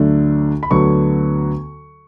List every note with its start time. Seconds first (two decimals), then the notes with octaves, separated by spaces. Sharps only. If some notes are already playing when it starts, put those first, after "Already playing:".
Already playing: D2 D3 F#3 A3 D4
0.63 B5
0.71 D2 D3 F#3 B3 C#6